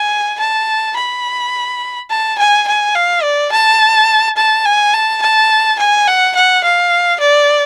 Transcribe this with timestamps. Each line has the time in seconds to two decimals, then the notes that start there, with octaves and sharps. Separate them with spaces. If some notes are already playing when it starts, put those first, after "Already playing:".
Already playing: G#5
0.40 A5
0.96 B5
2.11 A5
2.38 G#5
2.67 G#5
2.95 F5
3.23 D5
3.52 A5
4.37 A5
4.65 G#5
4.94 A5
5.22 A5
5.79 G#5
6.07 F#5
6.35 F#5
6.64 F5
7.20 D5